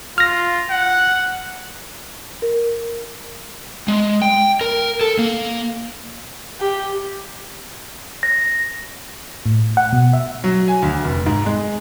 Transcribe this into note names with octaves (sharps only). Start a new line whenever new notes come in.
F4 F6 A#6
F#5
A#4
G#3
G5
A#4
A4
A#3
G4
A#6
A2
F#5
B2
E5
F#3
G#5
D2
F1
G#2
G#3